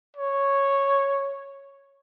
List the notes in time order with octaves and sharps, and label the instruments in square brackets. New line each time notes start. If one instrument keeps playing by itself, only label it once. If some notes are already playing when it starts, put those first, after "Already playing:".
[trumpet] C#5